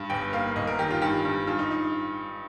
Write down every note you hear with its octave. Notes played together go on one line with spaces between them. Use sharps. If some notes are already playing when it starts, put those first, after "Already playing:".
Already playing: G2
G1 G5
A#3 F5
G1 D#5
A#4
D#3 G4
F4
G2 G4
G2
G2 F4
D#4
D#4